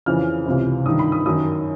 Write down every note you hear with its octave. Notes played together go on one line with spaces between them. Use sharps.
F2 C#3 E3 F6
C#2 C3 E3
G2 D#3 D#6
B5
D#6
F#2 D#3 D#6